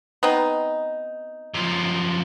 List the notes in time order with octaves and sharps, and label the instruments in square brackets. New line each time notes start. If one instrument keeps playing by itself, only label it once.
[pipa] B3 C4 D#4
[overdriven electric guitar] F#2 F3